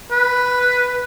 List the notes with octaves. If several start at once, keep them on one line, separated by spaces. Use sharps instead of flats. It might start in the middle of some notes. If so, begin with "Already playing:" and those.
B4